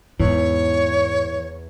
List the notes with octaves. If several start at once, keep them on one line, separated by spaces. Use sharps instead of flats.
E2 G#2 E3 C#5